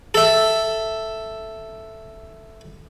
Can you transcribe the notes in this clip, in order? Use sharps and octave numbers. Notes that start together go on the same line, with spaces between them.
A4 E5